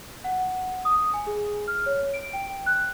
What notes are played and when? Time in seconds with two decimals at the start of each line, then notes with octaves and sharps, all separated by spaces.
0.24 F#5
0.85 D#6
1.14 G#5
1.27 G#4
1.68 F6
1.86 C#5
2.14 D7
2.33 G5
2.66 F#6